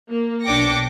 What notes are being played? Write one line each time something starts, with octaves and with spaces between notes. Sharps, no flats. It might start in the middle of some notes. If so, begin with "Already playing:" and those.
A#3
B1 D4 G5 D6 A#6 C#7